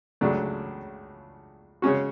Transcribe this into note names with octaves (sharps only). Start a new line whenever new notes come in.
C#2 C#3 F#3 A3 D4
C#3 G#3 C#4 F#4